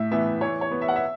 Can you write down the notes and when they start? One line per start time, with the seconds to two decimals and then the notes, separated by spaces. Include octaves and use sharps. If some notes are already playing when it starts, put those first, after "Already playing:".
Already playing: A2 E5
0.11 E3 B3 E5
0.41 E3 C#5
0.61 C#5
0.71 B3
0.81 E5
0.88 F#5
0.96 E5